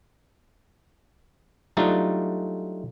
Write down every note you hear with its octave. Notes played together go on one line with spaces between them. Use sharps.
F#3 G3 A3 D4 D#4 F4